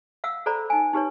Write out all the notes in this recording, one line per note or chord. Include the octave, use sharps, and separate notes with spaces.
F5 F#5 E6
A4 C5 D5 A#5 B5
D#4 G#5
D#4 G4 B4 C#5